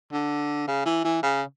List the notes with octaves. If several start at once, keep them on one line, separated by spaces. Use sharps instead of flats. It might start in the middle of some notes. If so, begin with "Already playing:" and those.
D3
C#3
E3
E3
C#3